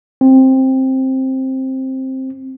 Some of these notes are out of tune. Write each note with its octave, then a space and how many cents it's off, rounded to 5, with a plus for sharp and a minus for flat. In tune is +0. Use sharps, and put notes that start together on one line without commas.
C4 +10